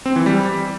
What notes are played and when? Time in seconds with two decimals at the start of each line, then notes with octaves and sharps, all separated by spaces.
0.06 C4
0.16 E3
0.26 G3